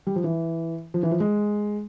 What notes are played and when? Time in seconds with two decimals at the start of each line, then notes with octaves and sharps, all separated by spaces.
0.07 G3
0.16 F3
0.24 E3
0.94 F3
1.03 E3
1.11 F3
1.20 G#3